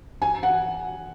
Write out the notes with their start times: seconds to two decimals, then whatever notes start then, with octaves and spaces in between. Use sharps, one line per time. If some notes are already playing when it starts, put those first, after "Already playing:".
0.22 G#5
0.43 F#5